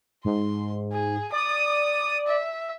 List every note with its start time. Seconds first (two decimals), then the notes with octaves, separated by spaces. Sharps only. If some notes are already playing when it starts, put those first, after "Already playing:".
0.25 G#2 C6
0.92 G#4
1.32 D5 D#6
2.27 E5